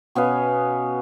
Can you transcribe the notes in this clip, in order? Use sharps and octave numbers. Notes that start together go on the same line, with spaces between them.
B2 B3 C#4 F5